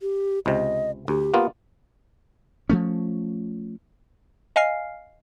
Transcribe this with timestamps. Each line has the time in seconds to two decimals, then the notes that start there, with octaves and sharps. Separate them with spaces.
0.01 G4
0.46 C#2 C3 D#5
1.08 D2 G4
1.34 A#3 B3 F4
2.70 F3 A3 C#4
4.56 D#5 F5 G#5 F6 C7